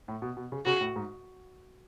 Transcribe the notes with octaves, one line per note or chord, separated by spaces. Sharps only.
A2
B2
B2
C#3
C#3 F#4
A2
G#2